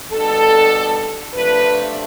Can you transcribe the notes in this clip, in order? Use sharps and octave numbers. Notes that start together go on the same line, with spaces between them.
B2 G3 D4 A4
C3 F3 A3 D4 B4